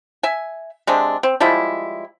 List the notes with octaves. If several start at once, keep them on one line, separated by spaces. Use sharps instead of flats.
E5 G#5
C3 G#3 C4 D4
C4
F3 G3 G#3 E4